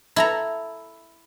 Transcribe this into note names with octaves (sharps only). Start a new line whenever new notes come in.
E4 A4 A#5